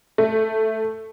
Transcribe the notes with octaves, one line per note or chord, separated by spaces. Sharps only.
A3